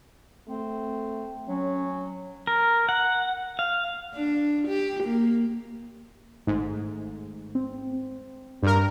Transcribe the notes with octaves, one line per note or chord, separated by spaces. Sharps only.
A3 C4
F#3 C#4
A#4
F#5
F5
D4
G4
A#3
G#1 G#2 A3
C4
G2 A#4